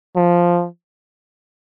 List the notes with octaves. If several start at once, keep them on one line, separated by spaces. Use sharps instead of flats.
F3